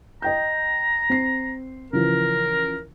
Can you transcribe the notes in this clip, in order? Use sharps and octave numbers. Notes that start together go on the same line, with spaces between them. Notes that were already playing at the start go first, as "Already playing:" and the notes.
D#5 G5 A#5 G6
C4 C7
C#3 E3 F3 A#4